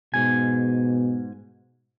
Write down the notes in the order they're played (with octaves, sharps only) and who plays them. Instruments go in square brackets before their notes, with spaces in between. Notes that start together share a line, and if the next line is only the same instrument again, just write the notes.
[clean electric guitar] G#2 G#5 [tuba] B2